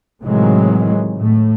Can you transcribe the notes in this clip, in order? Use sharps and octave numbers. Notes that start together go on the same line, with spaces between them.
A2 C3 D#3 E3 F#3 G#3
A2 A3